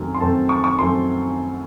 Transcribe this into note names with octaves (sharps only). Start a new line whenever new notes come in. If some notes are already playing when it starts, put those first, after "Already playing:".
Already playing: F#2 D#3 A3 C4
C6
F#2 D#3 A3 C4 A5
C#6
C#6
F#2 D#3 A3 C4 C6